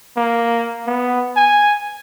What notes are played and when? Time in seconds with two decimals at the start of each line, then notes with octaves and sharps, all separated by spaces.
0.17 A#3
0.87 B3
1.37 G#5